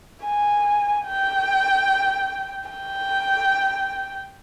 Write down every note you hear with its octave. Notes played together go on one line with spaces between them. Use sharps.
G#5
G5
G5